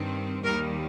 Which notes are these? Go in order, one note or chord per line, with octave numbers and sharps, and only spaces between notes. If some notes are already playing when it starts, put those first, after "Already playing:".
Already playing: G2 D#3 C4
D#2 D#3 G3 A#4